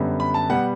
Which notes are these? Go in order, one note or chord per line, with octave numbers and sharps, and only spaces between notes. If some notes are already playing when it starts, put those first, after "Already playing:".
Already playing: F#2 D3 G3 B3
B5
A5
B2 G3 B3 F#5